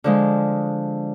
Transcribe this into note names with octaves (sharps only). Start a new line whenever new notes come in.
D3 F3 G#3